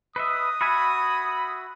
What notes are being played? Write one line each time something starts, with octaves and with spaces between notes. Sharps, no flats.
B4 D#5 E5 D#6
F#4 E5 G#5 B5